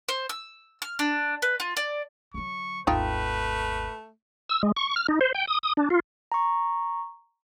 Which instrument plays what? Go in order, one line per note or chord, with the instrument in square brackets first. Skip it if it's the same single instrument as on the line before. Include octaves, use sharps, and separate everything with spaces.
[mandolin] C5
E6
F6
D4
B4
F4
D5
[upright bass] D3 F#3 [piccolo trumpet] C#6
[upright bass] G#1 D#2 [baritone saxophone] A3 [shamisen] D#4 F4 G5 [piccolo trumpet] B4
[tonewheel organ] E6
G#3
C#6
F6
D#4
C5
G5
D#6
D#6
D4
F4
[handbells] A#5 C#6